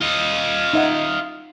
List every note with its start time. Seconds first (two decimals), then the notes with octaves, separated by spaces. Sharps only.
0.01 F4 D#5
0.73 D#4 E5 F#5